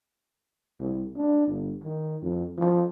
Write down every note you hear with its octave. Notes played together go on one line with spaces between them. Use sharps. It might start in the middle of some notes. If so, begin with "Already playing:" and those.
C2
D4
G1
D#3
F2
F3